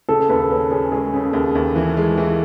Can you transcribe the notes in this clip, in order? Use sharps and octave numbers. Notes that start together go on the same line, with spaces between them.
C#3 A4
D#2 B4
C#4 B4
C#4 G#4
G#3 G#4
C#3
D#2
D#2
E3
G#3
E3